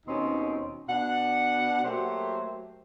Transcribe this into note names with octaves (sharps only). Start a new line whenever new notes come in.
D#2 B2 C4 C#4 D#4
B2 D4 F#5
F#3 A3 A#3 G4 C5